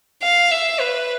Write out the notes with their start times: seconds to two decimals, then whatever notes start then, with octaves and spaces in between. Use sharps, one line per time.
0.22 F5
0.51 E5
0.80 B4